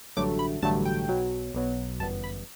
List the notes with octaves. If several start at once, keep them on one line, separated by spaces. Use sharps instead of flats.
A1 G2 D3 F#3 A3 D6
B5
A1 G2 D3 F#3 A3 A5
G5
B1 B2 F#3
B1 B2 F#3
G1 F#2 E3 G3 B3 A5
B5